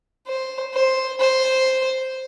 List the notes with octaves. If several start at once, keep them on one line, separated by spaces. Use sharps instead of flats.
C5
C5
C5